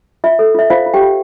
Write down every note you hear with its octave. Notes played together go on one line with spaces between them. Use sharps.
F4 E5
A4
F4 E5
F4 C5 F5
F4
G4 G5
F4